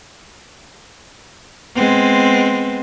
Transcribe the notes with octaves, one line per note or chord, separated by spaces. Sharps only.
G#3 B3 C4